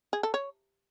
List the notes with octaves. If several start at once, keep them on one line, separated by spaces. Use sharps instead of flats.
G#4
A4
C#5